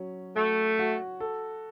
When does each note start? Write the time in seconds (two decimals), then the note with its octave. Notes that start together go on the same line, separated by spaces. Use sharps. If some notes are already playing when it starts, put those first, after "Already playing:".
Already playing: F#3 C#4
0.36 A3 F#4
0.79 F#4
1.20 A4